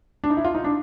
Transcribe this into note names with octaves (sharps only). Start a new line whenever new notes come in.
D4
D#4
E4
F4
D#4
D4